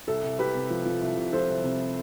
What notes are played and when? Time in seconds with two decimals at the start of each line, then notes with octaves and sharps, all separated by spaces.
0.07 C2 A4
0.24 C2
0.39 C2 G4 B4
0.55 C3
0.70 F3
0.85 F3
1.01 C2
1.17 C2
1.33 F3 A4 C5
1.48 C2
1.64 C3